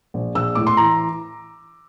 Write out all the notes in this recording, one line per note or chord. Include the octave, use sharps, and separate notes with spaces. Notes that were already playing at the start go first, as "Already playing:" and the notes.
A#1
A#1 E6
A2 D6
C6
E3 A#5